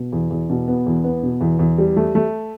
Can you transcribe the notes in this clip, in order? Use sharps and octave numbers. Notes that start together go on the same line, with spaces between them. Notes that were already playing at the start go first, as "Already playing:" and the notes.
Already playing: B2
E2
E2
B2
B3
E2
B3
B2
E2
E2
G3
A3
A3